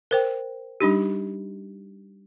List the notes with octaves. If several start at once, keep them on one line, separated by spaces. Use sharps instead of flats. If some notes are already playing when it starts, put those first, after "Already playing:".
A#4 C5 G5
G3 D4 D#4 G4